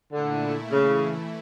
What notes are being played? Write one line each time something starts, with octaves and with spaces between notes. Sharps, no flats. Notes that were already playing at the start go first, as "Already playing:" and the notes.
A#2 D3 A3 E4
C#3 E3 A3 E4